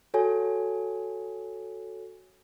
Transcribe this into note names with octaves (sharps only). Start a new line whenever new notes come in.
F#4 A4 C#5 G#5